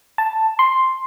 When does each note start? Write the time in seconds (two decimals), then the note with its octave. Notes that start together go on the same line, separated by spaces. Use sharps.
0.18 A5
0.59 C6